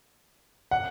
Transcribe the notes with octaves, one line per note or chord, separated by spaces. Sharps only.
F#5